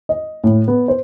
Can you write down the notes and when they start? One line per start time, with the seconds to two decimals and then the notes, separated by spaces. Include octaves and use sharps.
0.09 D#5
0.44 A2
0.68 B3
0.88 C5